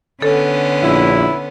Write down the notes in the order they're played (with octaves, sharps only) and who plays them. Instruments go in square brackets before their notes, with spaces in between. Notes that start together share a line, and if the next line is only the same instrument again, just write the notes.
[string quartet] D3 B3 C#4 [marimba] A4
[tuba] A#1 [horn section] E4